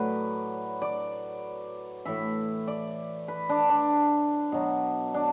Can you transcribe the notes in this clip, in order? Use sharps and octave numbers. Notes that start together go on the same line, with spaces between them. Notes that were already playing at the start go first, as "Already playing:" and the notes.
Already playing: A2 F#3 B4 D5
D5
A2 E3 E5
D5
B4
D4
D4
B2 F#3
D4